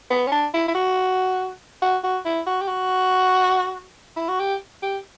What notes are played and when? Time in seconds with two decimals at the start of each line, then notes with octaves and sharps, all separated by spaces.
0.10 B3
0.27 C#4
0.32 D4
0.54 E4
0.68 E4
0.74 F#4
1.82 F#4
2.03 F#4
2.25 E4
2.46 F#4
2.61 G4
2.68 F#4
4.16 E4
4.28 F#4
4.40 G4
4.82 G4